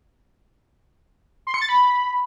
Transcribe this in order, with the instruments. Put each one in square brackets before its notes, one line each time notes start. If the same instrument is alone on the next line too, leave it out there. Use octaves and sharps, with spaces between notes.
[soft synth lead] C6
C#7
A6
B5